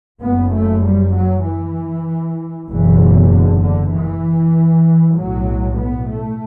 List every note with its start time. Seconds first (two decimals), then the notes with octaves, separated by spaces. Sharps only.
0.20 F#1 F#2 B3
0.52 A3
0.83 G3
1.14 F#3
1.44 E3
2.68 F#1 E2 B2 E3
3.30 D3
3.61 D3
3.92 E3
5.16 B1 A2 F#3
5.77 B3
6.09 A3